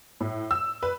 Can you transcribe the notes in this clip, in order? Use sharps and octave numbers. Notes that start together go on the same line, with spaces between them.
A2
E6
B4